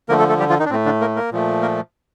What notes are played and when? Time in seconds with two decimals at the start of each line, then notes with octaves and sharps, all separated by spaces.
0.09 D3 F3 A3 A#3 A#4
0.19 A3 A4
0.29 A3 A4
0.39 G3 G4
0.50 F3 F4
0.60 D#3 D#4
0.66 D4
0.70 A2 A3 C4
0.85 D3 D4
1.01 A#3 A#4
1.16 A#3 A#4
1.32 A#2 F3 A3
1.62 A#3 A#4